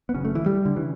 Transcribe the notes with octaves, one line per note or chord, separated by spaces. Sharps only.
B3
F#1 F#2 C#3 C#4
A3
E3
G3
D3
C#3 E3